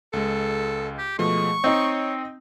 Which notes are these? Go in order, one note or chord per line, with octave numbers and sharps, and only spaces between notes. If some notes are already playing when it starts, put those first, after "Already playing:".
C#2 G#3 A4
G4
B2 F3 G#3 A3 C#6
C4 D#4 C#5 D#5 G5